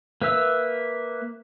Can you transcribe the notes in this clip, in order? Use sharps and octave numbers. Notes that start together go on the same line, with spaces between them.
A#3 B4 E5 E6